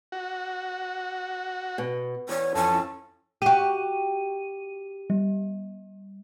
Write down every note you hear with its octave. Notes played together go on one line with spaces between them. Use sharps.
F#4
B2
E2 C#5
F2 C#4 A4
F#4 G4 D#7
G3